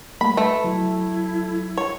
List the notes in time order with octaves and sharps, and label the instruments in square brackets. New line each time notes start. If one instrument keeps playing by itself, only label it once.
[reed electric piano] G3 A3 A#3 [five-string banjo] B5
[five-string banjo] A3 [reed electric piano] B4 A5 B5
[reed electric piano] F#3 [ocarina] E4
[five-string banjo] C#5